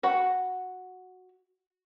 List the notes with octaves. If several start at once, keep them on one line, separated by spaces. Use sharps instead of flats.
F#4 F#5 B5